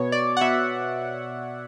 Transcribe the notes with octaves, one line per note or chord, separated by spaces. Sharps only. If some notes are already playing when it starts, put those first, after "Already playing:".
Already playing: B2 C#5
D5
F#5
B2 E5